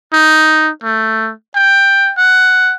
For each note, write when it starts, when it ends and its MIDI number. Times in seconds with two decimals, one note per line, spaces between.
0.13 0.70 63
0.83 1.32 57
1.55 2.12 79
2.17 2.75 78